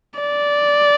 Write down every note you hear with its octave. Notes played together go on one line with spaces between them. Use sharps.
D5